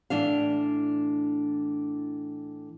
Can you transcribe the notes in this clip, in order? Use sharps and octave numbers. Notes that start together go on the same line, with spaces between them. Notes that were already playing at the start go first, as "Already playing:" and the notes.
A2 E3 D4 F5